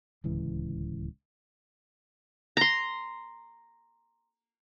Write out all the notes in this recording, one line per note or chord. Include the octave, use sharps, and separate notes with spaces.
D1 C#2 E3
A#5 C6